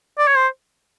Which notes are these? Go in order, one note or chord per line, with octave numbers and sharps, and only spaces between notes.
D5
C#5
C5